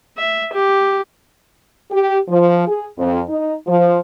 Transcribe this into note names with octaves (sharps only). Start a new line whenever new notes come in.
E5
G4
G4
F3
G#4
F2
D#4
F3